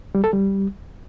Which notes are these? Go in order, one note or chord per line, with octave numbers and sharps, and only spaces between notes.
G3
A4
G3